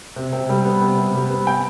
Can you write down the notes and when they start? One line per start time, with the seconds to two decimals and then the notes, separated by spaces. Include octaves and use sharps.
0.16 C3
0.33 C3
0.49 G3
0.65 B3
0.81 C3
0.98 C3
1.14 G3
1.30 B3
1.47 G5